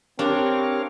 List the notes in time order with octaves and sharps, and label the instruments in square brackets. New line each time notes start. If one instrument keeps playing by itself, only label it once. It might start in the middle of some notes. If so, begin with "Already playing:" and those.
[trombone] C4 [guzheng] D4 [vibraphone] G4 [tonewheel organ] A#4 C#5 F5